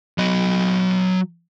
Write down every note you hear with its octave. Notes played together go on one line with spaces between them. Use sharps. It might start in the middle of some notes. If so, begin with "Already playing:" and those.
F#3 D#5